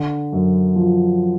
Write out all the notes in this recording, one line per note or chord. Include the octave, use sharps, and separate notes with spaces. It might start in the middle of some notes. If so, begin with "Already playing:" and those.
Already playing: D3
F#2
F3